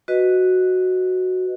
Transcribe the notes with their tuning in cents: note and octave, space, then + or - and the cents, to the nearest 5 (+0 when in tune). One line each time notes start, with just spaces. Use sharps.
F#4 +0 B4 +0 D#5 +0